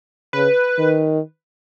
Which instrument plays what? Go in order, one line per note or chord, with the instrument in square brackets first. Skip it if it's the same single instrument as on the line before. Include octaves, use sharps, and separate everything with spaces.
[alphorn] C#3 [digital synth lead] B4
[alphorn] D#3